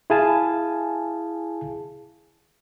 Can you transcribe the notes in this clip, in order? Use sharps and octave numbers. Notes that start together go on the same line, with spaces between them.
E4 G#4 F5 G#5 A5